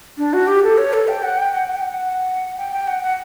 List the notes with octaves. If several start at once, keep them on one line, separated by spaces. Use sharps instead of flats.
D4
F#4
G4
A4
C#5
A4
G5
F#5
G5
F#5
F#5
G5
F#5
G5
G5
F#5
F#5